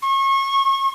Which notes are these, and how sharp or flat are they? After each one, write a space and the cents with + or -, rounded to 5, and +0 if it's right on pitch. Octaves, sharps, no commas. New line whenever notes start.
C#6 -30